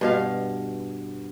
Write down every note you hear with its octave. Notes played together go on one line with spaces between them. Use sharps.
G2 B2 F5